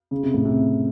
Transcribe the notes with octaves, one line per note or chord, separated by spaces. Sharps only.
C#3
C3
A2
C3